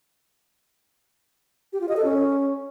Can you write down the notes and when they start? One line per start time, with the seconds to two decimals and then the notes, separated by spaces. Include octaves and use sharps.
1.73 G4
1.81 F4
1.89 D#5
1.97 A4
2.04 C#4